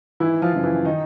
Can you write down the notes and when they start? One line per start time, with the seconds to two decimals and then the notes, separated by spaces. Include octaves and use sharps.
0.20 G#1 E3 E4
0.42 F3 F4
0.53 F#2 C#3 F3
0.63 E3 E4
0.85 D#3 D#4